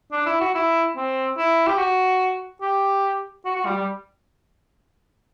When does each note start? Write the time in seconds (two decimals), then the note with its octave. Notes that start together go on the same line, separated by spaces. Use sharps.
0.12 D4
0.26 E4
0.40 F#4
0.54 E4
0.96 C4
1.38 E4
1.67 G4
1.78 F#4
2.61 G4
3.45 F#4
3.56 F#4
3.65 G3
3.76 G3